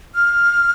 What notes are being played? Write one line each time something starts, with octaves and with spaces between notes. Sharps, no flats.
F6